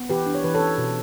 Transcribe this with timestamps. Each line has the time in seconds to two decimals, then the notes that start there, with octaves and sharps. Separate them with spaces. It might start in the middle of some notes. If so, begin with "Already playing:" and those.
Already playing: B3
0.09 E3 G4 B4
0.26 D4
0.35 C#5
0.44 E3 B4
0.54 A4 C#5
0.60 C#4
0.78 B2